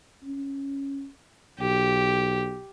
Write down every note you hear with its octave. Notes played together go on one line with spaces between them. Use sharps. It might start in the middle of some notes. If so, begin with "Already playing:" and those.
C#4
B1 G4